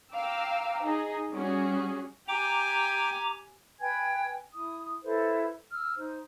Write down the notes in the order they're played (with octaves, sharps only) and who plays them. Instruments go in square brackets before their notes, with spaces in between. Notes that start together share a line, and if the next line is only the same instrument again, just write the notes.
[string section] F5 G5 A#5 D6 E6
D#4 G#4 D#5
G3 C#4 F#4 G#4
[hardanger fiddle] G4 G#5 [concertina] G5 [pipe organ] A#5 D6
[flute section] B4 G5 G#5 G#6
E4 D#6
E4 A4 B4 C5
E6 F6
D#4 C5